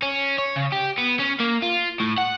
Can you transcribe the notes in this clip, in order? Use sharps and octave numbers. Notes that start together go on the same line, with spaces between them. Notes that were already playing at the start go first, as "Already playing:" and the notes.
C#4
C#5
C#3
G4
B3
C#4
A#3
F4
A2
F#5